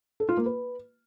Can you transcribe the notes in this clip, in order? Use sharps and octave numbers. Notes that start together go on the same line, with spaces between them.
A4
F4
A#3
B4